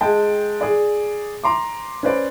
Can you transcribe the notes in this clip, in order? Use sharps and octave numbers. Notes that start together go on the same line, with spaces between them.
G#3 G5 A5
G#4 D5
A#5 C6 D6
C#4 B4 C5 D5